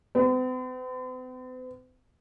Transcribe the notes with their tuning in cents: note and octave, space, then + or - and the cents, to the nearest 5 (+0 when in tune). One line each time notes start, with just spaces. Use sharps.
C4 -45